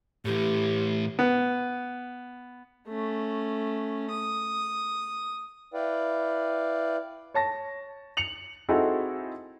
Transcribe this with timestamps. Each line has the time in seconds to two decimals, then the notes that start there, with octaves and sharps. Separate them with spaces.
0.25 A2 E3 G4
1.19 B3
2.88 A3 C#4
4.10 D#6
5.74 E4 B4 D5 F5 G5
7.34 C#5 A5 A#6
8.17 C#7 F7 F#7
8.69 C4 D#4 E4 F#4 G#4 A4